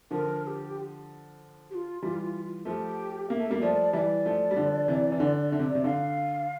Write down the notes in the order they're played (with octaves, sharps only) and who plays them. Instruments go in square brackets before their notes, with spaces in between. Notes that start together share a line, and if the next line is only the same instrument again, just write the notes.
[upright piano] D3 F3 [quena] A#4
[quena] A#4
G4
G4
F4
[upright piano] E3 G3 [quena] F4
[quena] F4
F4
[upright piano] F3 A3 [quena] G4 A#4
[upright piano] A#3 [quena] E5 F5
[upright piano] A3
G3 A#3
[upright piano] F3 A3 [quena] D5
[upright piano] E3 G3 [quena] D5 E5
[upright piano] F3 A3
G3
D3 F3
C3 E3
E3
[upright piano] D3 [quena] D5
[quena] D5
[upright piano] D3 [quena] E5
[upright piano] C3
[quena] D5
[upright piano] C3
[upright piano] D3 [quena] F5